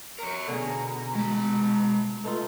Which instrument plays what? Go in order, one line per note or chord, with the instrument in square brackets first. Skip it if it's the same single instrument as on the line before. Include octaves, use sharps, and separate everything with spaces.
[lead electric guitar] A#4 C#5 [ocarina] A#5
[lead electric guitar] B2 [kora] D3 C#4 G#4
[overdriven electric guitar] G#3 A5
[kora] A3 D#4 F4 [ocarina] B4